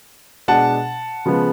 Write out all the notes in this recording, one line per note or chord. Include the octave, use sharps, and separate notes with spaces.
B2 G#3 D4 F#5 A5
C#3 F3 G#3 B3